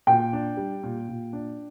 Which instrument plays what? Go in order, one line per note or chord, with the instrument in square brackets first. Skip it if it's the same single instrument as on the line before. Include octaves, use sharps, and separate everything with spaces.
[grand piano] A#2 [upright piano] G5
[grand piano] D4
G3
A#2
A#2
D4